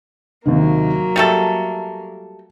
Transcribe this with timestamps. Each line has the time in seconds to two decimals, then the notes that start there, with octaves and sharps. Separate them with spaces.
0.46 D#2 C3 D#3 F#3 A#3
1.16 G3 A3 A4 C#7